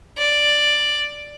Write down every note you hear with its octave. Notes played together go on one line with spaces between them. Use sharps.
D5